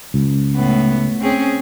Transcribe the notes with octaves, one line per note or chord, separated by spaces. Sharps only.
C#2
A2 B3
C4 C#4 G#4